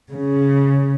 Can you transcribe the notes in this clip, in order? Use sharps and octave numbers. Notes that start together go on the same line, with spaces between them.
C#3